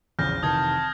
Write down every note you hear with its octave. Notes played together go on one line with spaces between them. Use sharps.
A#1 E2 C#3 F6 G6 A#6
F1 D#3 E3 A5 D#6 G#6